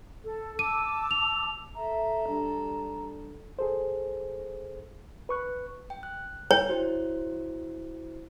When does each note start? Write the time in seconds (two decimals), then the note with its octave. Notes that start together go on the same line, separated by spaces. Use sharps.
0.24 A4
0.59 A5 D6 E6 D#7
1.11 F7
1.75 A4 E5 A#5
2.28 G3 D4
3.59 G#4 A4 C5
5.29 B4 C#6 F#6
5.90 G5
6.03 F#6
6.51 C#5
6.68 E4 F#4 C5